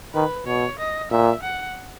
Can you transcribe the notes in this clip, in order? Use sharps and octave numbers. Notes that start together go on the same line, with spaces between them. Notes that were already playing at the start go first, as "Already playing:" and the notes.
D#3 B4
B2 C#5
D#5
A#2 E5
F#5